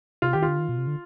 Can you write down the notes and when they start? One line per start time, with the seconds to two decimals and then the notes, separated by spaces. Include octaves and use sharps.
0.22 C3 F4
0.33 D#3 G4
0.42 F4
0.48 D3
0.59 D#3
0.69 B2
0.78 C3
0.87 D3